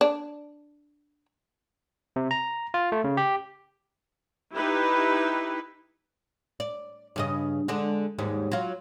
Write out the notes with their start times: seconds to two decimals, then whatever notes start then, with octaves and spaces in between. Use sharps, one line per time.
0.01 D4
2.16 C3
2.31 A#5
2.74 F4
2.92 A3
3.04 C#3
3.17 G4
4.53 D#4 E4 G4 B4
6.60 D5
7.16 G2 C#3 D#5
7.68 D3 G#3 D4
8.18 D#2 G#2 G3
8.52 F#3 F4